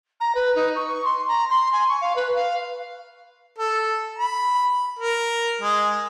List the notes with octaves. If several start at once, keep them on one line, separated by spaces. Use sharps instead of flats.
A#5
B4
D#4
C#6
C6
A#5
C6
G#5
C#6
F5
B4
F5
A4
B5
A#4
G#3